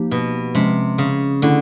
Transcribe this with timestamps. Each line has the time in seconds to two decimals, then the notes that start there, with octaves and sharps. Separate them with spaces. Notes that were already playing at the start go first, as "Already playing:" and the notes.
Already playing: F3 A#3 D#4 G4
0.11 B2
0.55 C3 F3 G#3 C#4
0.98 C#3
1.42 D3 A3 C#4 E4